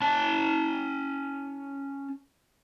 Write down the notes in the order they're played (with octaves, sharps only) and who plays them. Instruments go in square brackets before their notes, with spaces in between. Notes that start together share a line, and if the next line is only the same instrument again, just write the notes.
[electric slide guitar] C#4 A5